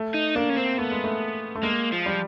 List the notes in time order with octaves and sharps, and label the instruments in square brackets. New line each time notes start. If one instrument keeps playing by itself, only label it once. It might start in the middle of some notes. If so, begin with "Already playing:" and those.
Already playing: [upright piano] A3
[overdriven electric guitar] D#4
[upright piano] A#3 [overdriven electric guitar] D4
[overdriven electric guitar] C#4
C4
[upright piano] A3 [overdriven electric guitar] B3
[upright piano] G#3
A3
A3
[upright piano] G#3 [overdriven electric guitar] A#3
[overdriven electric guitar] F3
[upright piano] G3